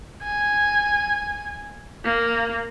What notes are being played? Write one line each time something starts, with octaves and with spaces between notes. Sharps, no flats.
G#5
A#3